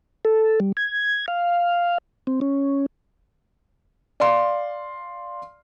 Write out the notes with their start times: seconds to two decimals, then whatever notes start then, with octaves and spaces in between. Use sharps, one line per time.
0.25 A4
0.60 G3
0.77 G#6
1.28 F5
2.27 C4
2.41 C#4
4.20 D5 F5 C6